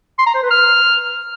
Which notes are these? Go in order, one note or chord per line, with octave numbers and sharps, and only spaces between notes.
C6
A#5
C5
B4
F6